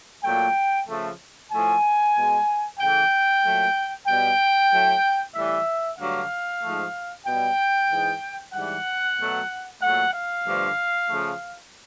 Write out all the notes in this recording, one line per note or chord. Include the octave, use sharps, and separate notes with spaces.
A#2 F#3 A3 G5
C#3 F3 A3
A2 F3 A3 G#5
B2 G#3
C#3 E3 A3 G5
A#2 F#3 A3
B2 G3 G5
A2 F#3 A3
A2 E3 G3 E5
G2 D3 F#3 A3 F5
G#2 F3 A3
B2 G3 G5
G#2 E3 G#3
G#2 E3 G3 F#5
B2 F#3 A3
A#2 F#3 A3 F#5
F5
G2 D3 F3 A3
C#3 F3 A3